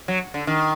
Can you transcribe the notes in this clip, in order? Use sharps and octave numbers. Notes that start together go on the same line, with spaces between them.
F#3
D3
D#3